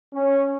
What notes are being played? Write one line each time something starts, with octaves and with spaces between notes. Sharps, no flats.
C#4